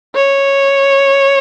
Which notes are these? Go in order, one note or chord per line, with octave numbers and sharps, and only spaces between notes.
C#5